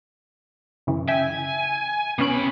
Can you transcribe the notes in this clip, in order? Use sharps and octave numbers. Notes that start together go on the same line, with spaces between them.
F#2 C#3 E3
E5 G5 G#5
C3 B3 C#4 B5 D7